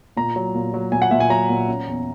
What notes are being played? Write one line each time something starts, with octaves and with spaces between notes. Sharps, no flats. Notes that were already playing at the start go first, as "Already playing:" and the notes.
A#2 A#5
F#3
A#2
F#3
A#2 G#5
F#5
A#2 E5
G#5
F#3 A#5
A#2
C#4
E2